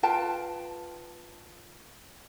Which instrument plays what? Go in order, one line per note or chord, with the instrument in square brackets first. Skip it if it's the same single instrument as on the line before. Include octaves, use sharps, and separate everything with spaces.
[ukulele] F4 B4 G5 A5